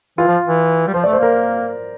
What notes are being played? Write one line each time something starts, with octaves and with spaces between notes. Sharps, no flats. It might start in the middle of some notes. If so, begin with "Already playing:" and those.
E3 F4
F3
E3
G3
F3 C5
A3 D5
C5
A#3 A#4